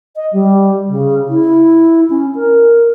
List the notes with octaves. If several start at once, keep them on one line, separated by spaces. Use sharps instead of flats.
D#5
G3
C#3
E4
C#4
A#4